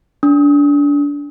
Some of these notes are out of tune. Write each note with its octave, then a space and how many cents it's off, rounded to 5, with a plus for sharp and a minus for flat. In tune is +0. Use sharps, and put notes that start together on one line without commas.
D4 -30 D#6 +40